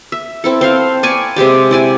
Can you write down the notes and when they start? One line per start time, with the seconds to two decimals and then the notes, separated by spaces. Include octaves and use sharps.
0.12 E5
0.44 C4 E4 A4
0.61 C4 C5 F5
1.03 D5 G#5 B5 C#6
1.36 C3 G#3 G4 D5
1.71 E4 D5 G#5